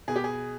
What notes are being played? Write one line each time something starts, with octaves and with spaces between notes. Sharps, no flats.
B2 G#4
G4
G#4